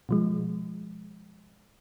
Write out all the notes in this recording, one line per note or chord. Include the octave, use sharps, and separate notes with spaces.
B2 F3 G#3